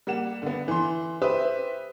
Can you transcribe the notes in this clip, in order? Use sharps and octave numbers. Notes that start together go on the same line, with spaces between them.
G3 A#3 F#5 E7
D3 B3
E3 C6
G4 B4 C5 E5 D#6